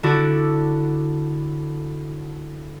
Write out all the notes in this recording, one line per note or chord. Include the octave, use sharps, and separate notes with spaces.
D3 D4 E4 F#4 A4